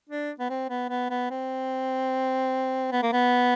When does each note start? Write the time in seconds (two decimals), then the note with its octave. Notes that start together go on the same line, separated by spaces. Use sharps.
0.09 D4
0.40 B3
0.50 C4
0.70 B3
0.89 B3
1.10 B3
1.30 C4
2.92 B3
3.02 A#3
3.13 B3